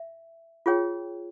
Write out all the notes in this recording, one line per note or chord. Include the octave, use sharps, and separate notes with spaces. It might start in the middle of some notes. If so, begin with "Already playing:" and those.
Already playing: E5
F4 G#4 C#5 G5